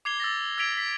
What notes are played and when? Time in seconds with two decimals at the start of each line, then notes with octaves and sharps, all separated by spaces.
0.05 D6 G#6 C7 F7 G7
0.20 E6 A6 A#6
0.58 E6 G#6 B6 D7 F7
0.78 B6